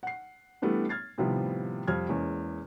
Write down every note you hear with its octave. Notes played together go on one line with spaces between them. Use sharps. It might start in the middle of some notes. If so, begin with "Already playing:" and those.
F#5 C7
E3 G3 A3 B3 D4 E4
F6 G#6 A6 C7
A2 C3 D#3 F3 G3 B3
F2 G3 F6 G#6
E2 G#3 A#3 C#4